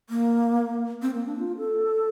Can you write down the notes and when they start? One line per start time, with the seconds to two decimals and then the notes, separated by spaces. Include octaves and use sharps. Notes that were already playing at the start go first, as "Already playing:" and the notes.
0.10 A#3
1.02 C4
1.14 A#3
1.27 D4
1.39 F4
1.58 A4